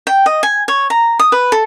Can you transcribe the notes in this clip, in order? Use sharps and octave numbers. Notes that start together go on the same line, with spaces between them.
G5
D#5
G#5
C#5
A#5
D#6
B4
A4